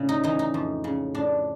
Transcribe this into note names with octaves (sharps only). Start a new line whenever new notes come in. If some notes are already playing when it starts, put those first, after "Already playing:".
Already playing: A2 C#3
D#4
E3 D#4
D#4
F2
C#3
A2 D4